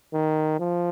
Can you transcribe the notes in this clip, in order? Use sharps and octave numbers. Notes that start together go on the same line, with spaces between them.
D#3
F3